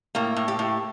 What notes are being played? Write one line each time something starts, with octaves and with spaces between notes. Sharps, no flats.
A2 A#3
A2
G4
A2